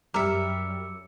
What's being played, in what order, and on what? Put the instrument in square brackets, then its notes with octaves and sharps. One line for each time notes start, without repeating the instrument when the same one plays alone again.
[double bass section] F#2 [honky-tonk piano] G3 [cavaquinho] A#4 E5 [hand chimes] D6 E6 C#7